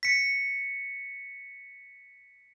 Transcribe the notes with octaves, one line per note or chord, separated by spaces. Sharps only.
B6 C#7